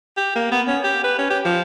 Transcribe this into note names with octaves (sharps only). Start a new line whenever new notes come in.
G4
A#3
B3
C#4
G4
B4
C#4
G4
F3